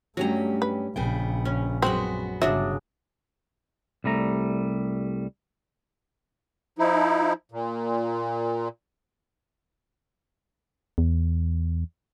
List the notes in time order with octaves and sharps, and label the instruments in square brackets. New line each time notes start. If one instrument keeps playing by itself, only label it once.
[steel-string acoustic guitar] G2 C#4 G4 [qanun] F#3 A#5 [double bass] A3
[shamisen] B4
[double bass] A#1 [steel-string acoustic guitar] C#3 B3 G5
[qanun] C#4
[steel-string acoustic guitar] F#2 B3 F#4 [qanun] G#3 B5 [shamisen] C4
[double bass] G1 C#3 [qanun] F#3 D4 G#4 [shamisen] E5
[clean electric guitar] C2 G3 A3 A#5
[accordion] F3 D#4 E4
A#2
[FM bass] E2